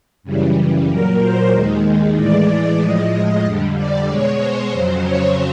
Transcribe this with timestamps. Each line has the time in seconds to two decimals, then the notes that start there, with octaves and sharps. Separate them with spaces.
0.23 F#2 C#3 E3 G3
0.87 A#2 F#3 A#4
1.19 C5
1.51 D#2 D#3 G#3
2.15 A2 E3 G#3 D5
2.79 A2 F3 G#3 D#5
3.43 F2 D3 G3
3.75 D5
4.07 B2 G#3 C#5
4.38 C5
4.71 F2 C#3 F#3
5.03 C#5